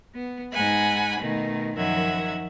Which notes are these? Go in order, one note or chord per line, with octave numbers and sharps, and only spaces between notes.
B3
G#2 F#5 G#5 B5
B2 D#3 A3
F#2 D#3 F3 E5 F#5 G#6